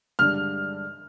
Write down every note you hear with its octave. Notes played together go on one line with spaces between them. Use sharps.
G2 D3 G#3 D4 F6